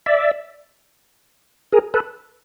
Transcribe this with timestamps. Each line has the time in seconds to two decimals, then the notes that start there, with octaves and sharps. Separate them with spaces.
0.06 D5 E5
1.72 G#4 A#4
1.94 A4 B4